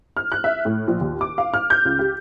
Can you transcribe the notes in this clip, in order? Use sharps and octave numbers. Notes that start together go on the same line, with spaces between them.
F6
F#6
E5
A2
A#1
D#2
D6
F5
F6
G6
C#2
G4